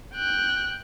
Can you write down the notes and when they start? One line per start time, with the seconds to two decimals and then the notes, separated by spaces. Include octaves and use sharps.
0.15 G5 F#6